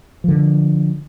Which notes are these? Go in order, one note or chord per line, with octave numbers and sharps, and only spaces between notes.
D3 F3